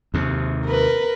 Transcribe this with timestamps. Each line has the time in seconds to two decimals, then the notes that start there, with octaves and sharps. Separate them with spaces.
0.14 D#2 C3
0.66 A#4 B4